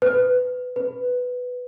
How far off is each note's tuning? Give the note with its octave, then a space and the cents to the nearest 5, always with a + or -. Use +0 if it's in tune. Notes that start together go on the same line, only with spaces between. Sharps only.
B4 +20
B4 +5